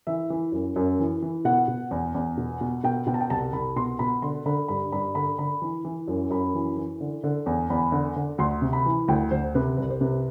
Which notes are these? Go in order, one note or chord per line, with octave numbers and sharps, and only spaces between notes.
E3 E5
E3
F#2
F#2
E3
E3
B2 F#5
B2
E2
E2
B2
B2
B2 G5
B2 G5
A5
G5
C2 A5
C2 B5
B2 C6
B2 B5
D3 C6
D3 B5
G2 B5
G2 B5
D3 B5
D3 B5
E3
E3
F#2
F#2 B5
E3
E3
D3
D3
E2
E2 B5
D3
D3
D2 C6
C3
B5
E3
D2 G5
D2 C5
C3 B4
C2 B4
C5
C3 B4